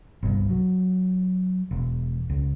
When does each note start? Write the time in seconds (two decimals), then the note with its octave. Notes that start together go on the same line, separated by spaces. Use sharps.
0.23 G1 C2
0.50 F#3
1.71 E1
2.30 C#2